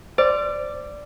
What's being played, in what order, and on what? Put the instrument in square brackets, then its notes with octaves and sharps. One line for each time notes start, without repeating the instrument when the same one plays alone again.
[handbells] C5 [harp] D5